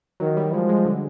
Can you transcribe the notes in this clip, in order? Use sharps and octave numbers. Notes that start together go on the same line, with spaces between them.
D#3 F#3
G3
F3 G#3
G#3
D3